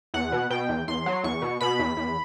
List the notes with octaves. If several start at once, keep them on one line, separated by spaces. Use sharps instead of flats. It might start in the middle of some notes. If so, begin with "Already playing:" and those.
E2 F#5
B2
B2 G5
E2
E2 C6
F#3
E2 C#6
B2
B2 B5
E2
E2